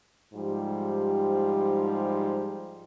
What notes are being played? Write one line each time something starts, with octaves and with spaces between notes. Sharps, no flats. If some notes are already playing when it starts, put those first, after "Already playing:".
G#2 F3 G3 G4